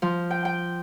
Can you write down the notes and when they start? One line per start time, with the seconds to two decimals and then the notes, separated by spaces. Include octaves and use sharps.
0.02 F3
0.31 G5
0.45 G5